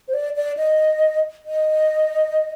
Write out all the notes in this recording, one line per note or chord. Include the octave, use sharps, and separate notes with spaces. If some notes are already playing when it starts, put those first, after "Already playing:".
C5
D5
D5
D#5
D#5